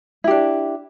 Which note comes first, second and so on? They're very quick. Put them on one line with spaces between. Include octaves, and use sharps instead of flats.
E4 G4 D4